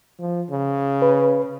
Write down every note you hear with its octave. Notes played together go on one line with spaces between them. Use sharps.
F3
C#3
B4